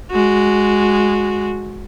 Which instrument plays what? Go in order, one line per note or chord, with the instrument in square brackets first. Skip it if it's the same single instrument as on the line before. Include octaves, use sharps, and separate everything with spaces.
[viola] G#3 F#4